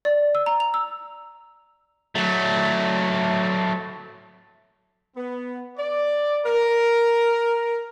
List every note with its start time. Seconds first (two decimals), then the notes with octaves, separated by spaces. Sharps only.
0.05 D5
0.35 E6
0.46 A#5
0.60 F7
0.74 E6
2.15 F#3 A3
5.16 B3
5.78 D5
6.46 A#4